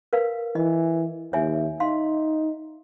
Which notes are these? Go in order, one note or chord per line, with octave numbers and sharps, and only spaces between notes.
A#4 B4 F5
E3 D#5
D#2 C#5 E5 G#5
D#4 F5 C6